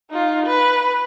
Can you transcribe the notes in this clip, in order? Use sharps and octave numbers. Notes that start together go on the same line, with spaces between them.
D#4 F4
B4